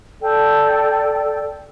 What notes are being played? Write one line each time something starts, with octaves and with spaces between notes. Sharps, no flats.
A4 D5 G5